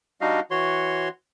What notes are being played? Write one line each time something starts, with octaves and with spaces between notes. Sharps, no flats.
G3 D4 D#4 F#4 D#5 F5
E3 F#4 C#5 C6